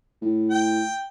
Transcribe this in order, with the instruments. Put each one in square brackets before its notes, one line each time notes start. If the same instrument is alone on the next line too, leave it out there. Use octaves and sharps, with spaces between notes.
[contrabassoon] A2
[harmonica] G5